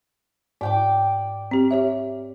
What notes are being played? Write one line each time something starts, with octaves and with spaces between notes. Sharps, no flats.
G#2 D5 G5 D6
C4 G4
G4 C#5 E5